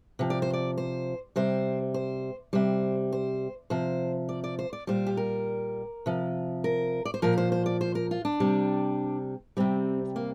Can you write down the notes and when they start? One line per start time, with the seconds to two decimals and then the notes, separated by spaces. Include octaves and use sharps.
0.19 C3 F3
0.30 D5
0.42 C5
0.53 D5
0.78 C5
1.36 C3 G3 C5
1.94 C5
2.53 C3 G3 C5
3.13 C5
3.70 C3 F3 C5
4.29 D5
4.44 D5
4.59 C5
4.73 D5
4.87 A#2 G3 C5
5.07 G4
5.17 A#4
6.06 C3 F3
6.64 A#4
7.05 D5
7.14 C5
7.22 A#2 F3 A#4
7.38 C5
7.52 C5
7.66 D5
7.81 C5
7.95 A#4
8.11 F4
8.25 D4
8.40 C3 G3
9.57 C3 G3 C4
10.16 A#3